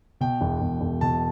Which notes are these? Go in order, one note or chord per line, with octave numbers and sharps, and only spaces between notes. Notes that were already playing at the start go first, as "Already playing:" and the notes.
B2 G5
E1
E1
E1
B2 A5